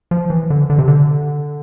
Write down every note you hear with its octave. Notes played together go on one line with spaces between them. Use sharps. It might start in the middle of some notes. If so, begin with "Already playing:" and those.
F3
E3
D3
D3
C3
D3